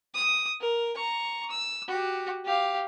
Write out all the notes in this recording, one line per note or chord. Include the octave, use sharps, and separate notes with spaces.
D#6
A#4
A#5 C#6
E6
F#4 G4
G4 F5